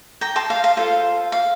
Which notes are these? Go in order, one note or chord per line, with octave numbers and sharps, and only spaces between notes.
G5 A#5
A5 C6
F5
F5
F4 A4 C5 F5
F5